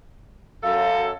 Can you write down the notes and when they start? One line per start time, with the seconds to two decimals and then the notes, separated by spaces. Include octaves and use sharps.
0.63 F#2 A4 F5